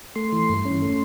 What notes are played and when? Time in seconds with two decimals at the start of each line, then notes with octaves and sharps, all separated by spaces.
0.15 A3 C6
0.33 E3
0.49 G2
0.65 C#4
0.82 A3